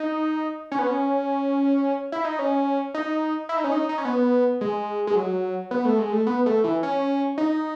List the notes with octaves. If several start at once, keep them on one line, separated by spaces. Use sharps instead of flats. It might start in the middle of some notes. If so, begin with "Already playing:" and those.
Already playing: D#4
C#4
B3
C#4
E4
D#4
C#4
D#4
E4
D#4
C#4
D#4
D#4
C#4
B3
G#3
G#3
F#3
B3
A3
G#3
A3
B3
A3
E3
C#4
D#4